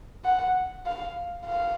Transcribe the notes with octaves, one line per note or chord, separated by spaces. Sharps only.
F#5
F5
F5